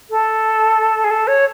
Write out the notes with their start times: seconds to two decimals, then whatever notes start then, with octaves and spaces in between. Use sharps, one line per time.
0.10 A4
1.04 G#4
1.11 A4
1.27 C#5